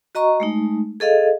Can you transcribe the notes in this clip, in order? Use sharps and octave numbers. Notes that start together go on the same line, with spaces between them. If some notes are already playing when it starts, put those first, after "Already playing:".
F#4 D#5 A#5 C#6
G#3 A3 D#4
G#4 A4 D#5 F5